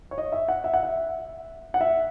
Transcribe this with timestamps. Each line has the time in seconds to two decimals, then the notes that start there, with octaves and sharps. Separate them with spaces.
0.11 C#5
0.18 D#5
0.32 E5
0.48 F#5
0.64 E5
0.74 F#5
0.83 E5
1.74 F#5
1.81 E5